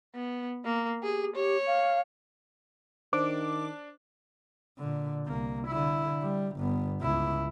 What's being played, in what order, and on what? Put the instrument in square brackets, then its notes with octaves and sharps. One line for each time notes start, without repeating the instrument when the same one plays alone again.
[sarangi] B3
A#3
[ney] G4 [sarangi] G#4
[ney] G4 [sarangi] C#5
[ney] F5
[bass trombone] D#3 [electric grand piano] D4 [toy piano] C5 [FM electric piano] D6
[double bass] A#2 D3
C2 A#3
D3 E4
G3
G1 B3
C#2 E4